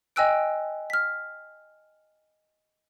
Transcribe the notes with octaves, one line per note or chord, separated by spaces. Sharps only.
D#5 G5 G#5 E6 F#6 D7
F6 B6